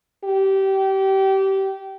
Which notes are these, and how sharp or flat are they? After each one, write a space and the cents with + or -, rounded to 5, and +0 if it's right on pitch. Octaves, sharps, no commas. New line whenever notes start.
G4 -25